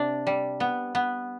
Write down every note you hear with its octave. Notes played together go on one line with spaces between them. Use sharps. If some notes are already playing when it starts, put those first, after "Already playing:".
Already playing: C3 D4
G3
B3
B3